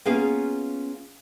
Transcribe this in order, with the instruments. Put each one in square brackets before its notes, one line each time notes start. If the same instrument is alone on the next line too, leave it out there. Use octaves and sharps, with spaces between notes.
[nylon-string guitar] A#3 B3 C#4 F4 G#4 F5